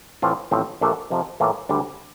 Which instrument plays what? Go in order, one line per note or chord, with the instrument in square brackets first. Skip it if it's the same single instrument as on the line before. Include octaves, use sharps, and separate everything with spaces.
[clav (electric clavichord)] A2 E3 A3 C4 F4
A1 A2 F3 C4
A#1 A#2 A3 D4 A4
F2 C3 F3
A2 E3 A#3 F4
D2 D3 G3 D4